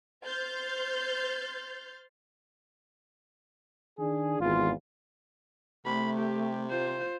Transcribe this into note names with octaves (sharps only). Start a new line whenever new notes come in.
C5 C6 F6 G6 A6
D#3 D4 G#4
G#1 E2 F4
C3 A3 B5
G4
F4 C5